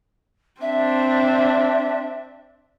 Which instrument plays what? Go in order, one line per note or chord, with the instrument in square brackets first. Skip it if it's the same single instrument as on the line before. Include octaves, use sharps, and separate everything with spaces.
[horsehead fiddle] C4 D4 [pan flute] E5